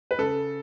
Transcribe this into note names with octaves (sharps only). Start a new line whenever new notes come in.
B4
C#3 A4